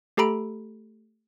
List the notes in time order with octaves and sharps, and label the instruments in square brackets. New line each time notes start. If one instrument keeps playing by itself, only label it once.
[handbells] A3 G4 A4 A#5 B5 D7